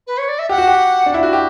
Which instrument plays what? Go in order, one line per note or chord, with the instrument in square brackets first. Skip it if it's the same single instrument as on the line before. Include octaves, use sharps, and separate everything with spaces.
[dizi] B4
C#5
D5
E5
[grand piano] G4 [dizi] F#5
[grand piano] F#4
G4
D4
E4
F#4
G4